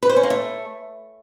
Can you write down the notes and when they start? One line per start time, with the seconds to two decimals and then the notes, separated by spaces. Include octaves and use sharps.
0.03 B4
0.09 C5
0.16 C#4
0.23 A#3
0.30 A3